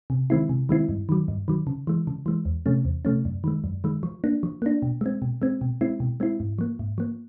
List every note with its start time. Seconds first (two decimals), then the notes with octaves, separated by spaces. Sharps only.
0.10 C3
0.30 D#3 G#3 C4 E4
0.49 C3
0.69 D#3 G#3 C4 E4
0.89 G2
1.09 D#3 F#3
1.28 G2
1.48 D#3 F#3
1.67 C#3
1.87 E3 G#3
2.07 C#3
2.26 E3 G#3
2.45 E2
2.66 C3 F3 A3 C#4
2.85 E2
3.05 C3 F3 A3 C#4
3.25 F#2
3.44 D#3 G#3
3.64 F#2
3.84 D#3 G#3
4.03 F3
4.24 A#3 D4
4.43 F3
4.62 A#3 D4
4.82 B2
5.01 G#3 C4
5.22 B2
5.42 G#3 C4
5.61 B2
5.81 G#3 C4 E4
6.00 B2
6.20 G#3 C4 E4
6.40 G#2
6.59 F3 A#3
6.79 G#2
6.98 F3 A#3